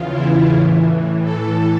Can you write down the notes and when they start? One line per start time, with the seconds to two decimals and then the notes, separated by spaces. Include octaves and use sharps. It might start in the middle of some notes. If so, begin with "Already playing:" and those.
Already playing: E2 C#3 E3 F4
0.11 E4
0.49 A2 E3
1.23 A2 E3 A4